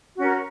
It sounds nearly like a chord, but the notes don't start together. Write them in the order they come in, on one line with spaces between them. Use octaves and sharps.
F#4 C#4 A#4